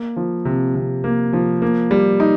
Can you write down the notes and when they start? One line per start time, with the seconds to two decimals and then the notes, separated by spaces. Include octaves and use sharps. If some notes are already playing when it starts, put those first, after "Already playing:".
Already playing: A#3
0.17 F3
0.45 C3
0.75 C3
1.04 A#3
1.33 F3
1.62 A#3
1.91 G3
2.20 D#4